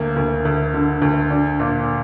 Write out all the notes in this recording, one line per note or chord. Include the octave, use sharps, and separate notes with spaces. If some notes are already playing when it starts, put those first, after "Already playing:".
Already playing: D2 A#3
D2
D2
D3
D2
D4
A#2